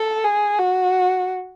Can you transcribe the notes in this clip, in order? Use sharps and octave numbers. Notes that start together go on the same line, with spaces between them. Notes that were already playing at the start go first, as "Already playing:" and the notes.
Already playing: A4
G#4
F#4